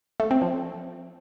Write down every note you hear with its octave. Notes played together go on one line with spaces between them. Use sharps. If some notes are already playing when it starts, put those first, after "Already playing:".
A3
C4
F3